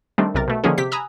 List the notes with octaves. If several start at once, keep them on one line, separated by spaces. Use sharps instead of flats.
D#3 G3 A3 C4 D4
B1 C3 A#4 A6
B2 A3
D3 D#3 F3 A#3 C#4 G#4
C3 G4 B6
G#5 A#5 B5 D#6 E6 F#6